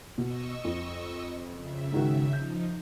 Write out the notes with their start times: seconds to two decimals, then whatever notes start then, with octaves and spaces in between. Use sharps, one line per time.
0.18 B2 D#5 C#6 E6
0.64 F2
1.54 C#3 E5
1.92 G#2 D#3 F#4
2.33 F3 D#4 G6